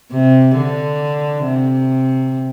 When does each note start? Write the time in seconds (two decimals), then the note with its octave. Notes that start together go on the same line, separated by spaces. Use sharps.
0.12 C3
0.57 D3
1.44 C3